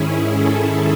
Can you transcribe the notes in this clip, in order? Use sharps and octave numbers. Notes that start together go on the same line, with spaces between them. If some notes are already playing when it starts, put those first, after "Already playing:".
Already playing: G#2 D#3 C#4 E4 G#4
A4